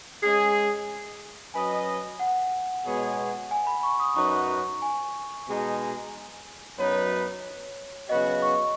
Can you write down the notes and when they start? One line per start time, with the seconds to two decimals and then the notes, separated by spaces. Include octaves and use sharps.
0.23 G#3 C#4 G#4
1.54 F#3 C#4 B4 D#5 G#5
2.19 F#5
2.85 B2 G#3 B3 G#4 C#5
3.51 G#5
3.67 B5
3.83 C#6
4.00 D#6
4.16 F#2 F#3 D#4 F#4 B4 C#6
4.82 G#5
5.47 B2 G#3 D#4
6.78 F#2 F#3 B3 D#4 B4 C#5
8.09 C#3 F#3 B3 F#4 D#5
8.42 C#6